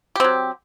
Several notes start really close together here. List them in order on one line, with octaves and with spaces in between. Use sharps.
G4 C4 F#3